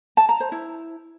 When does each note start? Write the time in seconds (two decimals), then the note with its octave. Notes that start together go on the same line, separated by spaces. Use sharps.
0.17 A5
0.29 A#5
0.40 C5
0.52 E4